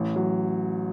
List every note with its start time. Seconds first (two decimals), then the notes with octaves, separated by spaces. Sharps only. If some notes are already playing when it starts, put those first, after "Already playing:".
Already playing: A1
0.16 F#3